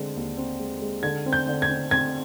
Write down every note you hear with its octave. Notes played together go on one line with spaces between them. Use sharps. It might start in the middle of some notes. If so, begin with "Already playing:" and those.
Already playing: D3 G#3 C4
D#2
C4
G#3
G#3
D3 G#6
C4
G6
D3
G#6
C4
C4 G#6